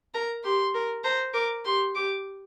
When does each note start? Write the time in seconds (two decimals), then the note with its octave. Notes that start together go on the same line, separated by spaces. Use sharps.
0.14 A#4 A#5
0.44 G4 C6
0.75 A#4
1.04 C5 A#5
1.34 A#4 D6
1.65 G4 C6
1.95 G4 D6